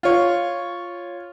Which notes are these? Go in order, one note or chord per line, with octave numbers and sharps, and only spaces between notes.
F4 C#5